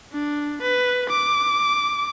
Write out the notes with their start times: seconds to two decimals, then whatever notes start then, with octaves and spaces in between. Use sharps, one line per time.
0.12 D4
0.62 B4
1.10 D6